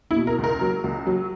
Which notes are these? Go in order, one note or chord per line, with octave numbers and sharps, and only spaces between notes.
E4
B2
A#4
C#2
A#4
F#3
C#2
F#3